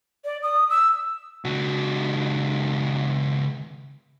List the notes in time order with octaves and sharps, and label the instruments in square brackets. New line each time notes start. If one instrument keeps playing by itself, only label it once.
[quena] D5
D#6
E6
[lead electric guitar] C#2 F#4